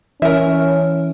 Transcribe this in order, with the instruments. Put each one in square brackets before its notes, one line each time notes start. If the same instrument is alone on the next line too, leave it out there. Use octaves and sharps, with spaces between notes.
[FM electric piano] E3 [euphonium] C#4 [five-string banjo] A#4 E5